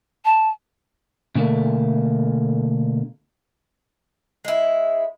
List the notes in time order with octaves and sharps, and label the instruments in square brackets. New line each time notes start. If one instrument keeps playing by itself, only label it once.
[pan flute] A5
[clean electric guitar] B2 D3 A3 A#3
[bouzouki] G#3 E4